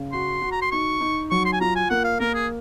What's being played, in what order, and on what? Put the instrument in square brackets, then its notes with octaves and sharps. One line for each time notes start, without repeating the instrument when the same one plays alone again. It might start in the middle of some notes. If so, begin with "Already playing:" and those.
Already playing: [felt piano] C#3
[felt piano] F#4 [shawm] C6
[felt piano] F#4
[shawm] A#5
C6
[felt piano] D#4 [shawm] C#6
[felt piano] D#4
[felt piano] F#3 [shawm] C#6
[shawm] C6
G#5
[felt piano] F4 [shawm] A#5
[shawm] G#5
[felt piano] A#3 [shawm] F#5
[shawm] F5
[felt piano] A#3 [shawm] A#4
[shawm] G#4